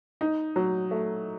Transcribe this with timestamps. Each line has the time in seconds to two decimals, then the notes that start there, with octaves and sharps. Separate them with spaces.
0.21 D#4
0.56 F#3
0.91 A3